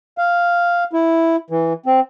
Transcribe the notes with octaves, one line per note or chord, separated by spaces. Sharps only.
F5
E4
E3
C4